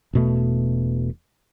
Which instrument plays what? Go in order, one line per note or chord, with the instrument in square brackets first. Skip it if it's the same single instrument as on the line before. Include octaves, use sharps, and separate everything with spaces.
[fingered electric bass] E1 B2 A3